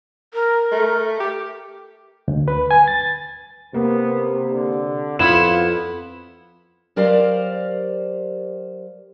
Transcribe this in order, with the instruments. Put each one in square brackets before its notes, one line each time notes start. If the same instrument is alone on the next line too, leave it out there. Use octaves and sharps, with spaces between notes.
[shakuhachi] A#4
[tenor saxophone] A3
G4
[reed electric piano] D2
B4
G#5
A6
[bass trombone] C3 [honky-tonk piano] A#3 [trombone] B3
[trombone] D3
[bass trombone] F2 [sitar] B3 E4 [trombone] F4 [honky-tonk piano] E7
[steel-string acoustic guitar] F#3 G4 A#4 C5 D5 F5